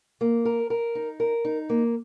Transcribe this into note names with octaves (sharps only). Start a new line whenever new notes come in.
A#3
A#4
A#4
D#4
A#4
D#4
A#3